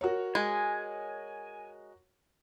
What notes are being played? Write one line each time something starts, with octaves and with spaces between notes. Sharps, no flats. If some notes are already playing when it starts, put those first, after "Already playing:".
F#4 A#4 C#5
G#3 G#5